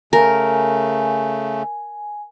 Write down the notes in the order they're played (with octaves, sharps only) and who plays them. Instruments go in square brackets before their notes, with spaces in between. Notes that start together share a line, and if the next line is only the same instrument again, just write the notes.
[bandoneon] C#3 A3 [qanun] A#4 [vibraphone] G#5